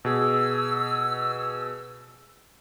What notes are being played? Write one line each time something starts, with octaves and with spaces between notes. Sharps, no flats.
B2 G#4 E6